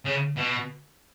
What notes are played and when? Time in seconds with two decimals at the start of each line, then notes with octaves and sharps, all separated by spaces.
0.05 C#3
0.37 B2